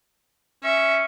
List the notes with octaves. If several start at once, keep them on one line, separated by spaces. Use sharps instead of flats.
C#4 E5